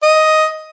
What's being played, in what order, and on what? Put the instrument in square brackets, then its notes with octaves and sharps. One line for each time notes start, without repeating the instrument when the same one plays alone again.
[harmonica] D#5